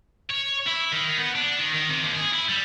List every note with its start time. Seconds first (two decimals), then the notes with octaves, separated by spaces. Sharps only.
0.30 C#5
0.67 E4
0.92 D#3
1.18 B3
1.35 D4
1.59 D#3
1.74 D#3
1.89 C3
2.03 D#2
2.15 G#4
2.33 E4
2.49 G3